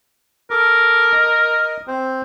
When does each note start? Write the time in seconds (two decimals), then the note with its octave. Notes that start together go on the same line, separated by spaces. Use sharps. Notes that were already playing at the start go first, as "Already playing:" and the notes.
0.51 A4 A#4 D6
1.12 D#5
1.88 C4 C5